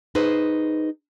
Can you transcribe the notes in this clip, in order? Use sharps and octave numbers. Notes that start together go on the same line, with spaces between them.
D#4 G#4 B4 C5